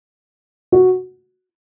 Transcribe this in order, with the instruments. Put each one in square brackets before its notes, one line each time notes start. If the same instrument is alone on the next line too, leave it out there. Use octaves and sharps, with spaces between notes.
[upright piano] F#4